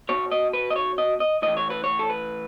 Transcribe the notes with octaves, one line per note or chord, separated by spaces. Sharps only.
B2 C#5
D#5
B4
D#5
C#5
D#5
D#5
A2 E3 D#5
C#5
B4
C#5
A4
B4